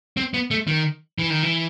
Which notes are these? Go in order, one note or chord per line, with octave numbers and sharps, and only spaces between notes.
C4
B3
A3
D#3
E3
D#3
E3